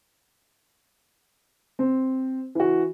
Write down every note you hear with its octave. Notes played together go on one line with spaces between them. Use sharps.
C4
E3 F#4